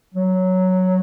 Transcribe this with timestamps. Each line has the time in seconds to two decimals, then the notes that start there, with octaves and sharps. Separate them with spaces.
0.14 F#3